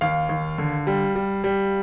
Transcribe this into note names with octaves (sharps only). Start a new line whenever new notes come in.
D#2 F5
D#2
D3
G3
G3
G3